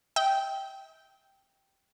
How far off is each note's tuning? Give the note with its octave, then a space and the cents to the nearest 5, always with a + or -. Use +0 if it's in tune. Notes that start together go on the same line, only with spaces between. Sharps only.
E5 -35 G5 +0